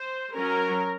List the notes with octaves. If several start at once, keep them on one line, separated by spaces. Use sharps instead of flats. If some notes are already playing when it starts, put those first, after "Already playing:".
Already playing: C5
F#3 C#4 A#4